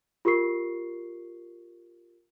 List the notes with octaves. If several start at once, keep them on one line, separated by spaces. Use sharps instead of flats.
F4 G4 A#4 C#6 C7